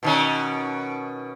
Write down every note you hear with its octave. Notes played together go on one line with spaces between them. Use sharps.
B2 D#3 C#4